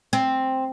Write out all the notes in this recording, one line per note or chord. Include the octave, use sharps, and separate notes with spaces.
C4